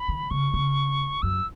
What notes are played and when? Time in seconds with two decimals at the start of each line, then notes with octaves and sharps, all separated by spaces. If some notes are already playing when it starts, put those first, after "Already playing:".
Already playing: B5
0.08 D#3
0.30 C#3 C#6
0.54 C#3
1.22 F#2 E6